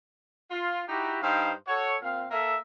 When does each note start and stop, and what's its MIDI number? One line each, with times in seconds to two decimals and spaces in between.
0.51 0.82 65
0.88 1.17 63
0.88 1.17 64
0.88 1.17 66
0.88 1.17 67
1.22 1.53 43
1.22 1.53 63
1.22 1.53 72
1.22 1.53 77
1.22 1.53 79
1.67 1.96 66
1.67 1.96 69
1.67 1.96 73
2.02 2.25 46
2.02 2.25 60
2.02 2.25 77
2.31 2.56 58
2.31 2.56 69
2.31 2.56 76